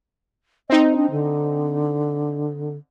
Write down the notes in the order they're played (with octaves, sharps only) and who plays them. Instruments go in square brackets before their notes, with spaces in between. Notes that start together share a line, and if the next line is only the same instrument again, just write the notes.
[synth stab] C4 D#4 [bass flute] D#5
[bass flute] D4
D3